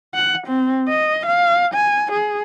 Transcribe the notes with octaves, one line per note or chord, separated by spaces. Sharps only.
F#5
C4
D#5
F5
G#5
G#4